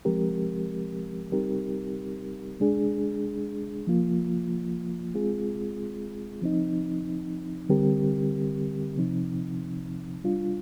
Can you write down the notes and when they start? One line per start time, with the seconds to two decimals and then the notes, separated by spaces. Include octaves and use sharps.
0.05 F3 G#3 C4 G4 A#4
1.32 G3 C4 D#4 G4 A#4
2.60 G#3 D4 G#4
3.87 F3 A#3 F4
5.14 G#3 C4 F4 G#4
6.42 F3 C4 D#4
7.69 D3 G3 C4 G4 A#4
8.96 C3 F3 C4 D#4
10.24 G3 D4 F4